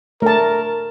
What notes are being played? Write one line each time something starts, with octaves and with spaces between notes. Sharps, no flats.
A3 A#4 A5